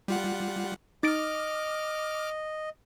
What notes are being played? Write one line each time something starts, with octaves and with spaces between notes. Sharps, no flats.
G3 F4 F#5
D#4 D#5 D6 F6 A6 D7